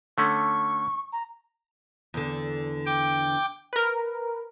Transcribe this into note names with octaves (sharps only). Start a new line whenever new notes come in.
D3 A3 C#4 C#6
A#5
E2 D3
G5 D6
A#4 B4